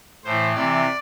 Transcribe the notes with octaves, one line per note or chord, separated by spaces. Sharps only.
A2 E3 C5
C3 E3 D5